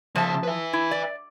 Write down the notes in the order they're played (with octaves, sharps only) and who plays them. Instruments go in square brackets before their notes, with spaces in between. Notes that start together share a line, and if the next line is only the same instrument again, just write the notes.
[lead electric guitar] C#3 E5 [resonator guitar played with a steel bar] F3 A5
[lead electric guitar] B4 E5
[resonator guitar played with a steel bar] E4
D5